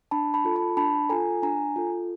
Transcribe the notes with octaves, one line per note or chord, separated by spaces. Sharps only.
D4 A5 B5
A5 B5
F4 A4
A5 B5
D4 A5 B5
F4 A4 G#5 A#5
D4 G#5 A#5
F4 A4